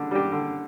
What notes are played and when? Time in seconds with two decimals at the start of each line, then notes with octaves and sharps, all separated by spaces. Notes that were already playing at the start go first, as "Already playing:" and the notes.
Already playing: D3 G3 D4
0.11 G3 D4 G4
0.32 D3